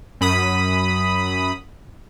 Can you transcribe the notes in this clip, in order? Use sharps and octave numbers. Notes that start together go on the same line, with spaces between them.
F#2 B5 D#6